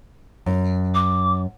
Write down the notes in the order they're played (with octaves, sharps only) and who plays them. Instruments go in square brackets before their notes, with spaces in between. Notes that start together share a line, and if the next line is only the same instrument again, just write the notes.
[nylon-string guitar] F#2
[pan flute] D6